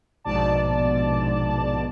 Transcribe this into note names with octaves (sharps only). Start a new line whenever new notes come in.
A#1 G#2 B2 D5 A5